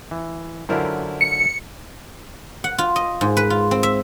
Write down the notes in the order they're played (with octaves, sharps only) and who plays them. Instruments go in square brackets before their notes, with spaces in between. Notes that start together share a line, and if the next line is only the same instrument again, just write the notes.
[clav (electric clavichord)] E3
[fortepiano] F#2 E4 A#4 [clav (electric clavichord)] D3 F4 C5
[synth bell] C#7
[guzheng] F#5
F4
D#5
G#2
B4
F4
C4
E5